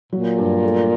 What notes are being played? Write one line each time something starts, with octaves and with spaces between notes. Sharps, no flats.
A#2 F#3
G2
A3